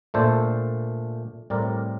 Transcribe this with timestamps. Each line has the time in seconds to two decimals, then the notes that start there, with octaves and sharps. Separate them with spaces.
0.14 A#2 A3 D4 A4 C5
1.50 A2 G3 C4 A#4 D5